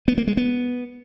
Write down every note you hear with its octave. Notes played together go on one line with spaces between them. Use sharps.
B3
A#3
G#3
B3